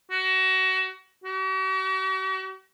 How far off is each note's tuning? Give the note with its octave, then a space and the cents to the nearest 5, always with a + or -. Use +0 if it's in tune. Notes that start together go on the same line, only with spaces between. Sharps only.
F#4 +30
F#4 +45